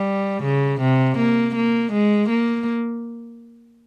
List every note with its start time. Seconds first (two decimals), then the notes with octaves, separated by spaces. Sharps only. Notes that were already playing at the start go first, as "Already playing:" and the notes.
Already playing: G3
0.44 C#3
0.81 C3
1.18 A#3
1.56 A#3
1.93 G#3
2.30 A#3